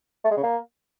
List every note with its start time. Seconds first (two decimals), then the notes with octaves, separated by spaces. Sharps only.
0.25 A3
0.31 G#3
0.37 C#3
0.43 A#3